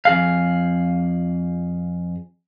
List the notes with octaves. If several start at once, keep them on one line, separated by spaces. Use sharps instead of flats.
F2 G#4 F5